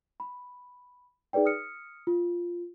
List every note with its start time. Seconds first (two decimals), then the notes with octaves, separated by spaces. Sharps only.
0.20 B5
1.33 D#4 G#4 B4 D5 G5
1.45 D#6 F6 C#7
2.07 F4